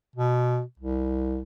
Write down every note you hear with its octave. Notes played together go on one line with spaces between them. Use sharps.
B2
C2